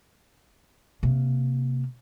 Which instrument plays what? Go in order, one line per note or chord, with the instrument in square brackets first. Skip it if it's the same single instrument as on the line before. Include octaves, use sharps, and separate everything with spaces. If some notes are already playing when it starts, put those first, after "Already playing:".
[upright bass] C3 A#3